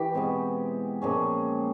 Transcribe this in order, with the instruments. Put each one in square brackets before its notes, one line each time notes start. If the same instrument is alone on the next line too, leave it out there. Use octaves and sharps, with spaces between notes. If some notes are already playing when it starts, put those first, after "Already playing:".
Already playing: [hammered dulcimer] E3 G4
B2 G#3 C4
A#2 F3 G#3 C#4